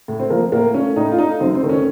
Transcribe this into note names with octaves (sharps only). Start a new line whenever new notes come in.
A2
C4
F3 A#3
A2 A#3
A3 C#4
A2 D#4
F4
A3 D#4
F#2 C4
C4
D#3 A3
C#4